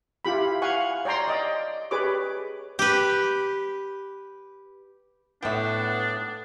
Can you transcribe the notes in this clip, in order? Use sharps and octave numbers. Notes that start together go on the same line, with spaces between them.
E4 F4 G4 B5
F5 F#5 G#5 C#6
C#5 D5 G5 A#5 C6
D5 D#5 G5
G4 G#4 B4 C#5 D6
G4 B4
A2 B3 D4 E4 E5 G5